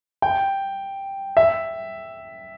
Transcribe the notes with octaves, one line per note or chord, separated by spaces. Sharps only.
G5
E5